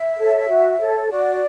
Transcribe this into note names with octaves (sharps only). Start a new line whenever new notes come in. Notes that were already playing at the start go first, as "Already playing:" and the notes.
Already playing: E5
A4 C#5
F#4
A4 C#5
F#4 D5